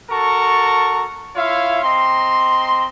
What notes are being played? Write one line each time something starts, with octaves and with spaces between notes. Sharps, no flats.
F#4 A4 A#4 A5 A#5 C#6
E4 F4 C#5 E5 F5
C4 D#5 A#5 C6